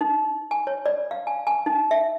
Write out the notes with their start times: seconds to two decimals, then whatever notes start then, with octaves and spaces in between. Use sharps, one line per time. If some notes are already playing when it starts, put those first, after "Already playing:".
0.01 D#4
0.51 G#5
0.67 C#5
0.86 D5
1.11 F5
1.27 G#5
1.47 G#5
1.66 D#4
1.91 E5